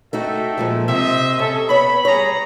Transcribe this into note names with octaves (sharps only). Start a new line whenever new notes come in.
A3 D#4 F#4 A4 E5 G5
A#2 F3 G#3
C3 C5 D#5 E5
C3 C#4 A4
B3 C#5 B5
G3 G#4 C#5 A#5